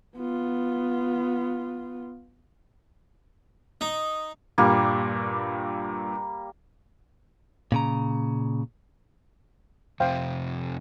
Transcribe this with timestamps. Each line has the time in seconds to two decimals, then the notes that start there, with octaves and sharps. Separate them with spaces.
0.17 B3 F4
3.81 D#4
4.58 G2 A#2 G3 A#3
7.72 A#2 C#3 A#5
10.00 F2 C3 C5 F5 G5